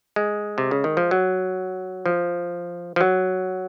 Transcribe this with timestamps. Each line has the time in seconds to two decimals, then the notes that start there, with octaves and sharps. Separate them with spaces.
0.16 G#3
0.58 C3
0.71 C#3
0.84 D#3
0.97 F3
1.11 F#3
2.06 F3
2.96 F3
3.01 F#3